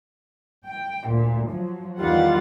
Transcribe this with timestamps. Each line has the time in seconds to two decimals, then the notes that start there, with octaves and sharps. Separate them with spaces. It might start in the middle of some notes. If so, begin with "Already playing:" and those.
0.66 G5
1.08 D2 A#2
1.50 F3 F#3
1.99 E2 D#3 G3 F4 F#5 A6